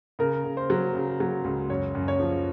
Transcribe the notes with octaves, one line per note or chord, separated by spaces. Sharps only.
C#3 A#4
C#3
C5
F#3
C#3
F#3
C#2
F#2 C#5
F#2
C#5
F3